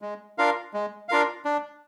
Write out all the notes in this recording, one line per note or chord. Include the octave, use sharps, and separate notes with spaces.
G#3
D4 F4 A#4 F5
G#3
D4 F4 A#4 F5
D4